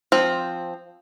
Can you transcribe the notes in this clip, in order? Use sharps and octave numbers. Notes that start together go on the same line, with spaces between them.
F3 C4